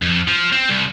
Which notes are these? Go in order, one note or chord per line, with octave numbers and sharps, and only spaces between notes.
F2
F3
C4
C2